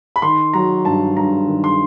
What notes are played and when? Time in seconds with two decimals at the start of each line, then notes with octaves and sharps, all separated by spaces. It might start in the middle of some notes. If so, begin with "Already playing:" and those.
0.16 B5
0.22 D#3 C6
0.53 F#3 A#5
0.85 G2 A5
1.17 G2 A#5
1.48 D#3
1.64 C6